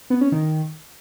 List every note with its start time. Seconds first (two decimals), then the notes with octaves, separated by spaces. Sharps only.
0.10 B3
0.21 C#4
0.32 D#3